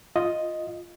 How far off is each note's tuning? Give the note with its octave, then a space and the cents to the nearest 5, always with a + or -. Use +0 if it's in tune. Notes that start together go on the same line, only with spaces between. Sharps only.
F4 +0 D#5 +0